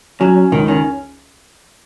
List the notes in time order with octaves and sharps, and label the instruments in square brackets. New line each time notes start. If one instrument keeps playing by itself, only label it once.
[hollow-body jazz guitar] F#3 [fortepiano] C#4
[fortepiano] C#4
[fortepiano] C#2 [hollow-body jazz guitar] D#3
[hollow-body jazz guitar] D#3 [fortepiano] C#4